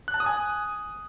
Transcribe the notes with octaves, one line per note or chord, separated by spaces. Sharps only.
F#6
A5
D#6
G#5